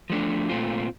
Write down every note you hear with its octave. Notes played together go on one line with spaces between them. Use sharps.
F3 A3 D4
A#2 A3 C4 F4